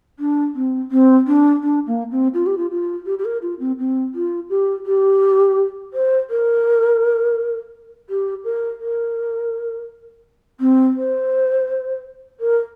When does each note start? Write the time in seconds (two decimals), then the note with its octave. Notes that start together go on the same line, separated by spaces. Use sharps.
0.19 D4
0.55 C4
0.91 C4
1.27 D4
1.63 D4
1.87 A#3
2.11 C4
2.34 F4
2.46 G4
2.58 F4
2.71 F4
3.06 G4
3.19 G4
3.25 A#4
3.42 F4
3.60 C4
3.79 C4
4.15 F4
4.50 G4
4.86 G4
5.94 C5
6.30 A#4
8.10 G4
8.44 A#4
8.80 A#4
10.60 C4
10.97 C5
12.40 A#4